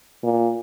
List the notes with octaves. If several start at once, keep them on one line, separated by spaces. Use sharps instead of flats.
A#2